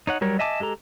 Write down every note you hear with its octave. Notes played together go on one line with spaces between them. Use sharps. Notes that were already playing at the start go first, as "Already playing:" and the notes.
D#4 C#5 F#5
F#3 G3 A#4 C#5
D#5 E5 G#5 A5 D6
G#3 G4 A4 A#5